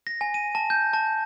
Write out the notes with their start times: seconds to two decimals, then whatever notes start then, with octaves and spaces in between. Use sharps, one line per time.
0.07 A#6
0.21 G#5
0.34 D#7
0.55 A5
0.70 G6
0.93 A5